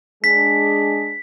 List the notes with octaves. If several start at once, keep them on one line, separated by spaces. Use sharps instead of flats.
G#3 D4 G#4 B6